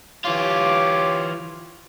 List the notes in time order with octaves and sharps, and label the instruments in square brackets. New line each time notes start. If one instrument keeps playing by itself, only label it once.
[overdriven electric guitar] E3 F4 [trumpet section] G4 C#5 D6